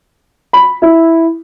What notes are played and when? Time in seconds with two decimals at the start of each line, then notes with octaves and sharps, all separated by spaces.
0.53 B5
0.82 E4